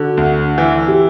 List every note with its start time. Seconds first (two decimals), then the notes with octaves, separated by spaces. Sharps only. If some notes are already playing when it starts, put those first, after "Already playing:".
Already playing: D3 F#4
0.17 D2
0.58 E3
0.88 G4